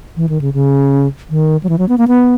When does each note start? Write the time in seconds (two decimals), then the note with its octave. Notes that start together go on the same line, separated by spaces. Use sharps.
0.17 E3
0.29 D#3
0.41 C#3
0.54 C#3
1.30 D#3
1.63 F#3
1.69 E3
1.78 F#3
1.89 B3
1.98 A#3
2.08 B3